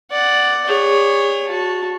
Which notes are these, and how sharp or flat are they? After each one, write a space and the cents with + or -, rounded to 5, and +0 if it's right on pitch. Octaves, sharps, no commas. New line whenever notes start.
D5 +0 F#5 +10
G#4 -45 C#5 +0
F#4 -20 A5 +0